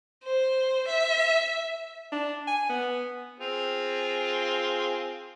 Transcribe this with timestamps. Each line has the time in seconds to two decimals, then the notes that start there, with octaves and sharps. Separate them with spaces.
0.24 C5
0.88 E5
2.12 D4
2.47 G#5
2.69 B3
3.40 C4 F4 G#4